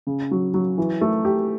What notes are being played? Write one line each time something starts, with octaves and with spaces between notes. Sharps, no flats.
C#3
F#3
F#3
E3
A3
G4